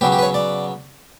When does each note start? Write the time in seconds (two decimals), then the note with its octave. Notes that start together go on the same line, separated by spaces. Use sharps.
0.01 C#3 F#3 B3 G4
0.12 G4
0.19 B4
0.23 C#5
0.34 D5